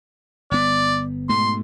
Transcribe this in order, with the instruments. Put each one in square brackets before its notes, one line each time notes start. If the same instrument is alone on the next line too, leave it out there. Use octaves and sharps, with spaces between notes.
[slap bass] G1 B3 [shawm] D5
[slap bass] G#2 B2 A3 [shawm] C6